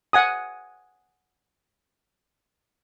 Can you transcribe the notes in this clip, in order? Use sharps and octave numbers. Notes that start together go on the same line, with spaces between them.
F#5 G#5 D#6